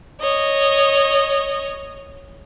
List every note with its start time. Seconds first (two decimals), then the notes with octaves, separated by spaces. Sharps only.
0.20 C#5 D#5